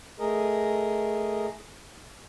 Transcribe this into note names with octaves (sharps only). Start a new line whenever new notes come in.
A3 G#4 A#4 D#5